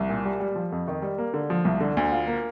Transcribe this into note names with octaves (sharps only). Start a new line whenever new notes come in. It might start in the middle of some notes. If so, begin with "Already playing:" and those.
Already playing: C2
A#2
G3
G3
F3
F2
D#3
G3
A#3
D3
F3
C2
D3
D2
F4
A#3